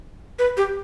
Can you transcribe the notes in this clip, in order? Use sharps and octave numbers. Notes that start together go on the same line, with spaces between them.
B4
G4